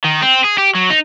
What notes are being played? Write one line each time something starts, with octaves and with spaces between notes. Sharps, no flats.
D#3
C4
G#4
G4
F#3
D#4